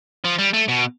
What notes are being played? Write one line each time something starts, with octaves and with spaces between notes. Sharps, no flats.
F3
G3
A3
B2